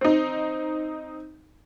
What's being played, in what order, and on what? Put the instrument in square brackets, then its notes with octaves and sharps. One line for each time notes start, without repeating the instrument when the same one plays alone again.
[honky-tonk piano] C4 D#4